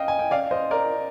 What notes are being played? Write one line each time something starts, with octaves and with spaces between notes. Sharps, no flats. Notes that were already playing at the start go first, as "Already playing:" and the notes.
Already playing: D#5 F5 G5
G#5
G5
D5 F5
C5 D#5
A#4 D5